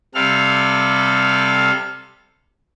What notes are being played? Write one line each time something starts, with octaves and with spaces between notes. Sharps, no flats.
C3 G3 A4 F5 F6